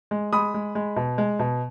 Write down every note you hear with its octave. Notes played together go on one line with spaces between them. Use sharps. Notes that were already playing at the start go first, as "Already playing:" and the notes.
G#3
G#3 B5 D#6
G#3
G#3
B2
G#3
B2